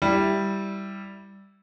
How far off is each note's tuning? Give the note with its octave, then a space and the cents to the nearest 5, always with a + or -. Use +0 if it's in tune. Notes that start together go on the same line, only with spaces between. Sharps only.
G3 +0 E4 +0